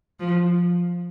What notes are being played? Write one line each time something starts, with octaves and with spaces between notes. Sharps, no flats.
F3